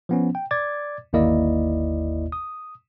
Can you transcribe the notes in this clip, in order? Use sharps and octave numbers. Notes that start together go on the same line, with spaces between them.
F3 B3 C#4
G5
D5 D6 G#6 A6
G1 D#2 A#3 E4 D5 D#5
D#6